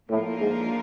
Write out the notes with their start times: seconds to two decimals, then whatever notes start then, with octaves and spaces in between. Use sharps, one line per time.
0.10 A2 F3 A#3 D4 F4 A#4
0.40 G#2